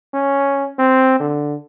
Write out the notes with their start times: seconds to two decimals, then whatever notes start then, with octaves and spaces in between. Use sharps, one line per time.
0.14 C#4
0.79 C4
1.20 D3